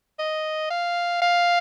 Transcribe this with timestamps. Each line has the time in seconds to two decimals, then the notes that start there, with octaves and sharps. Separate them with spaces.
0.19 D#5
0.70 F5
1.22 F5